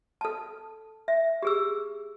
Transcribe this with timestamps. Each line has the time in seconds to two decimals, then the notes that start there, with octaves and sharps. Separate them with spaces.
0.21 A4 A5
1.08 E5
1.42 G4 G#4 E6